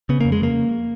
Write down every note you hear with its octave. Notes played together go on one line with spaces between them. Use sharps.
C#3 B3
F2 A#3
G#3
C#3 A#3